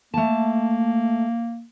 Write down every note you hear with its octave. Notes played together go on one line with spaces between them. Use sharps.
A3 A#3 A5